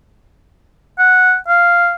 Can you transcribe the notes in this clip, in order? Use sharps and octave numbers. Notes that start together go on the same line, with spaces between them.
F#5
F5